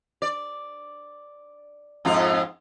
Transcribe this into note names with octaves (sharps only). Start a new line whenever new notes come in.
D5
F2 G#2 F4